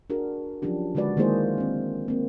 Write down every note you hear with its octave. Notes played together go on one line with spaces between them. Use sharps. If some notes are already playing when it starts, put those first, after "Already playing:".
D4 F#4 G#4 A#4
F3 F#3 C#4 D4 G4
D3 D#3 G#3 F#4 B4 D5
D#3 G#3 A#3 E4 G#4 C5
C4 D4
A#3 C4